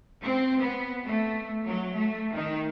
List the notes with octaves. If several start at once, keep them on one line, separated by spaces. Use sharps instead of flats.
C4
B3
A3
F#3
A3
D#3